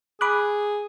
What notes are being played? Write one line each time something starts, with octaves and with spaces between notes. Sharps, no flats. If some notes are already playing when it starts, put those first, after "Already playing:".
G#4 B5 D6 F#6